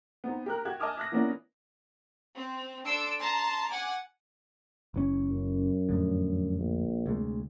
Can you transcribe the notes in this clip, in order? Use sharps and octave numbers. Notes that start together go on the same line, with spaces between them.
B3 C4 D#4
G4 A#4 F#6
F#4 G4 F#6 G#6
D#5 G#5 A5 D6 D#6 F6
E5 F#6 A#6
E3 A#3 B3 C#4 D4 E4
C4
D4 A4 C6 E6 D7
A5 A#5 C6
F#5 G#5 D6
F#1 E3 C#4
F#2
F2 A2 D3
A#1
D2 C3 G#3